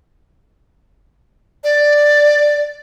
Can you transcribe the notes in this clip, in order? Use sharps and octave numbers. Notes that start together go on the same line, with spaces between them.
D5